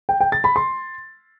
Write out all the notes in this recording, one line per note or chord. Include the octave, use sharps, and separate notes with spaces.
G5
G5
A6
B5
C6